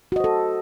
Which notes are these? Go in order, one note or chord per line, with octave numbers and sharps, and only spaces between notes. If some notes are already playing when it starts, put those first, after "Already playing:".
F#4 A4 C5 D#5